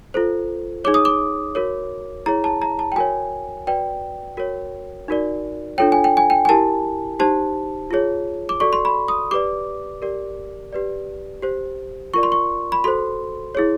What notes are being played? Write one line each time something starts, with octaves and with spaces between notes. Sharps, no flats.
F4 A4 C5
D#4 G#4 C#5 D6
D#6
D6
F#4 A#4 C#5
E4 G#4 C#5 A#5
A5
A#5
A5
G5
F#4 A#4 C#5 G#5
F#4 B4 D5 G5
F#4 A#4 C#5
D#4 F#4 A#4 D5
D4 F4 A4 C#5 G5
G#5
G5
G#5
G5
G#5
E4 G4 A#4 A5
D#4 G4 C5 A5
F4 G#4 C#5
D6
F#4 A4 D5 C#6
C6
B5
D#6
G4 B4 D5 D6
G4 A#4 D5
G4 B4 D5
G4 C5
F4 A#4 D5 C#6
C6
C#6
B5
F#4 A4 C5 C6
E4 G#4 C#5